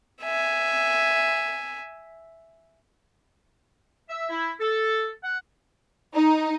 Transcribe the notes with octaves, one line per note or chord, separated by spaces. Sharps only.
E5 G#5
E5
E4
A4
F#5
D#4